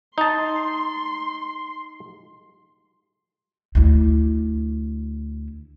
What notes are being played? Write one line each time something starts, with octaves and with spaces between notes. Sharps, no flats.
D#4 A5 C6
D2 E4